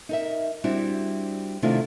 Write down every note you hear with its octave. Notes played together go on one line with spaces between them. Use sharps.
D#4 A#4 E5
G3 C4 D4 E4 F#4
C3 D#3 A3 D4 E4 F4